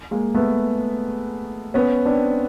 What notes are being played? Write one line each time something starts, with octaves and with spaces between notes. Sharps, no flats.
G#3 A#3
A3 B3
B3 C#4
C4 D4